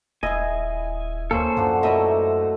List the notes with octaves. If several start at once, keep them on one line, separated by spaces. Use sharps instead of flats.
D#1 E4 G#4 D#5 G#5
D2 A#3 C#4 A4 C5
F#2 D3 F3 F#4
B2 A3 E4 D#5 E5 A#5